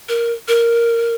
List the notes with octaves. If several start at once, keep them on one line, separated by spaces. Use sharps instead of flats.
A#4
A#4